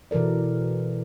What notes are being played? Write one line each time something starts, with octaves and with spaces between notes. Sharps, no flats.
B2 E3 A4 A#4 D5